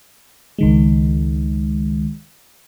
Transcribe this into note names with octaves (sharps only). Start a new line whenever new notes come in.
C#2 D#3 G#3